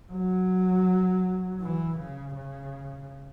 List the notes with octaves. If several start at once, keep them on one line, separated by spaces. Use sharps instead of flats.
F#3
E3
C#3
C#3